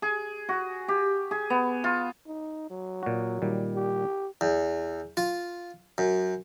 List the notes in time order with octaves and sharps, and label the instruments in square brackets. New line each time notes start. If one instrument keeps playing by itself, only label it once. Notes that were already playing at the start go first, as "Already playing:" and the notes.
[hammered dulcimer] G#4
F#4
G4
G#4
B3
F4
[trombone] D#4
F#3
[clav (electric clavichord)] A#2 F#4
A#2 D#3 G3
[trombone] G4
[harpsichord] E2
F4
F#2